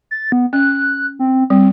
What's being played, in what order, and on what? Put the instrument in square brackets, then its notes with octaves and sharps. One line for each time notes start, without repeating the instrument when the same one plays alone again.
[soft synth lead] A6
B3
[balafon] C#4 [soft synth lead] F#6
[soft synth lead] C4
[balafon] G3 [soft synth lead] C4